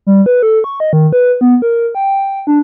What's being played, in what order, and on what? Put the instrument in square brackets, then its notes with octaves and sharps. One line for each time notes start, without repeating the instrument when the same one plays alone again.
[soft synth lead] G3
B4
A4
C#6
D#5
D#3
B4
B3
A#4
G5
D4